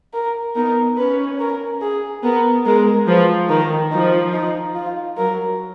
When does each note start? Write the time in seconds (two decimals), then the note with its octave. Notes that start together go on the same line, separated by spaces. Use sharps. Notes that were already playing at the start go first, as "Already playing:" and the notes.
0.13 A#4
0.55 B3 D#4 A#4
0.97 C#4 B4
1.39 A#4
1.81 G#4
2.23 B3 A#4
2.65 G#3 A#4
3.07 F3 B4
3.49 D#3 A#4
3.91 F3 D#4
4.33 D#4
4.75 F4
5.17 F#3 A#4